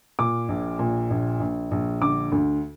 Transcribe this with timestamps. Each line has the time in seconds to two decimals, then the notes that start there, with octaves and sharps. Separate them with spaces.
0.19 A#2 D6
0.49 A#1
0.79 A#2
1.10 A#1
1.40 A#1
1.71 A#1
2.01 D3 D6
2.32 D2